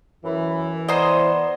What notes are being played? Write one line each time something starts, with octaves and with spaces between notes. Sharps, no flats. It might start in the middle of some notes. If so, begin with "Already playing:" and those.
F#2 E3
B3 C5 D5 D#5 A#5